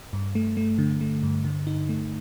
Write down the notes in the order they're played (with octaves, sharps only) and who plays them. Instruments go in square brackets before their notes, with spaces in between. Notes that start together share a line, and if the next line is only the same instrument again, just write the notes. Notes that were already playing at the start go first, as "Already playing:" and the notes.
[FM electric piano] G2
A3
A3
D3
A3
G2
D3
D#4
A3